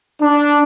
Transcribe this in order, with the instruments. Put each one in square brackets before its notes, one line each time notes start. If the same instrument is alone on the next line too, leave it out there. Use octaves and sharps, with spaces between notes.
[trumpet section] D4